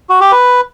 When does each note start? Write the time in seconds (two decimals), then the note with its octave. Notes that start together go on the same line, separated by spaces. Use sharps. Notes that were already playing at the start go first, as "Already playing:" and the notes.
0.10 F#4
0.21 G4
0.32 B4